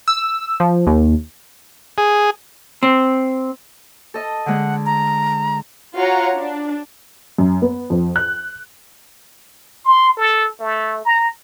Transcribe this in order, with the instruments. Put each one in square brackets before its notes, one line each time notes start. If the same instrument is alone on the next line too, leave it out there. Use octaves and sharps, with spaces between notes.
[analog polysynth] E6
F3
D#2
[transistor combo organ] G#4
[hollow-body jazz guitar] C4
[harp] A4 D#5
[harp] D3 G#3 [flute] F#5
[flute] A#5
[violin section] F4 F#4 C#5 F#5 A#5
D4
[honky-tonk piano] F#2
B3
F2
F#6
[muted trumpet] C6
A4
A3
A#5